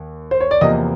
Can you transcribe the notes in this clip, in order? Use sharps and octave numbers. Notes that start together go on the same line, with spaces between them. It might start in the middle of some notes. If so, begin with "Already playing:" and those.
Already playing: D#2
C5
C#5
D5
E2 C3 F3 A#3 D#5